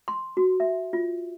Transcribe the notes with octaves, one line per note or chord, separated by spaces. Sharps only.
C6
F#4
E5
F4